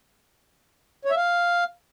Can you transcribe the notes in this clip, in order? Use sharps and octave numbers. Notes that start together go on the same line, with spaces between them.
C#5
E5
F5